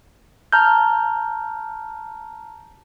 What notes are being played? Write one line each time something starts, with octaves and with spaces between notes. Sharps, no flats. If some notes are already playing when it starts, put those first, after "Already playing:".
A5 A#5 F6 G6